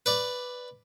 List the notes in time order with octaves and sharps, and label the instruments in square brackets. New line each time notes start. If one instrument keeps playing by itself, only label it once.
[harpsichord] B4 D5